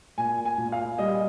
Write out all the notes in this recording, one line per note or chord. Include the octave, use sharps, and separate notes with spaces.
A#2 G#5
G#5
A#2
F5
G3 D#5